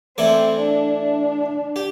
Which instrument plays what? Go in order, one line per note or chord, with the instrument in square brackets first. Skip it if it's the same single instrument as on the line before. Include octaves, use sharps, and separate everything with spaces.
[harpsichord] E3 A3 E4 A4 D5 [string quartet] C4
[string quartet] D4
D4
[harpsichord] G4